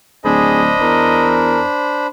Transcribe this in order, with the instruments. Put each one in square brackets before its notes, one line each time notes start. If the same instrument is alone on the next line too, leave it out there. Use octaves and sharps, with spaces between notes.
[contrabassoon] D1 [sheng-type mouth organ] D4 C5 B5 [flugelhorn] G#4 [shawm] D#5
[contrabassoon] E2 [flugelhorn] A#4